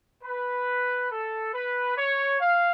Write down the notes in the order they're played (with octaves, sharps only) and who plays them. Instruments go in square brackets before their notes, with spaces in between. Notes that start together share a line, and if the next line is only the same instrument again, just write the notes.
[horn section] B4
A4
B4
C#5
F5